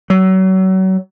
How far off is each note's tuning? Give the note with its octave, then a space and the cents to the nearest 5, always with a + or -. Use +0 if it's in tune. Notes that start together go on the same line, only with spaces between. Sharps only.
F#3 +30